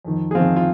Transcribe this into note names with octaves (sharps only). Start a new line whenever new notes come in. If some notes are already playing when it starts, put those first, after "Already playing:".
F2 D#3
G#4
F2 D#3 C4 F4
F4